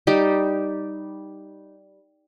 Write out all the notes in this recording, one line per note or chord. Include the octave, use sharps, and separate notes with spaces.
G3 D#4 G4